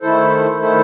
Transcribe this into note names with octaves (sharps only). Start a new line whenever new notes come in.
D#3 A3 E4 A4 C5
D#3 A3 E4 A4 C5